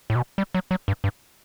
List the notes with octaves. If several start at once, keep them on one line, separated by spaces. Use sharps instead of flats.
A2
B2
G3
F#3
F#3
G2
G2